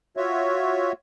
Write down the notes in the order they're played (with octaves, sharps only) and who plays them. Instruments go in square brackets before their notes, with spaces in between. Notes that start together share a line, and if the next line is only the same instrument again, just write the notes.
[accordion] F4 F#4 C#5 E5